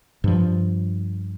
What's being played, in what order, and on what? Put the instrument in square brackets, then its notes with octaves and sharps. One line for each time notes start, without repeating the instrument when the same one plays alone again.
[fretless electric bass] G2 F3